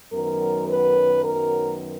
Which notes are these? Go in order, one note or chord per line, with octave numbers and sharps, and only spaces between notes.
F#2 D#3 F#3 B3 A#4
B4
A#4